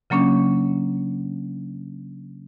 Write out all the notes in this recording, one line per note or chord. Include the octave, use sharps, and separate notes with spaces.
C#3 F#3 A#3 C#4 D4